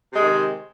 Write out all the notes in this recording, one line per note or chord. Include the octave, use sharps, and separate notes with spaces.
C3 D#3 G#3